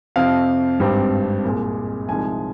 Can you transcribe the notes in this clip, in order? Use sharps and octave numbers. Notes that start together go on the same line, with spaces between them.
F2 C3 F3 C4 F5
G#1 G2 G3 C4
C2 A#2 G#3
C2 C3 F3 G#3 D#4 G#5